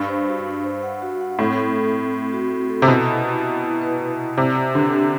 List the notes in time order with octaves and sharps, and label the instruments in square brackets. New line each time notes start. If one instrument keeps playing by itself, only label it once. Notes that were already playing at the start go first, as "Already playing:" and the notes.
Already playing: [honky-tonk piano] G2
[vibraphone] C5
F#4
D4
C5
F#5
F#4
F#5
[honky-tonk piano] A2 [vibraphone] C4
[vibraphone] A4
C4
C4
C4
F#4
C4
A4
[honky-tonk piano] C3
[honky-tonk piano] B2 [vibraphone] E4
[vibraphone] E4
E4
E4
E4
B4
E4
E4
[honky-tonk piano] C3 [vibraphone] D5
[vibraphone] G4
[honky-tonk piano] D3 [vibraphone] B4
[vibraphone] G4